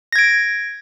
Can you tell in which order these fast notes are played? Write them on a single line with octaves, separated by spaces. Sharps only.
A#6 G#6 D7